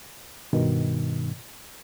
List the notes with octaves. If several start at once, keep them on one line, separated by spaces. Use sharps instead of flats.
G2 B2 D#3